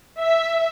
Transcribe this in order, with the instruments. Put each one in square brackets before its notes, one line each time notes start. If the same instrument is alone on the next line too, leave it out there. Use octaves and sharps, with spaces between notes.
[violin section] E5